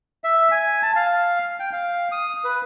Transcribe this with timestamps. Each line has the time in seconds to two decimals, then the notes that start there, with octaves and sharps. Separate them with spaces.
0.24 E5
0.51 G#5
0.82 A5
0.96 F5
1.60 G5
1.73 F5
2.12 D#6
2.44 B4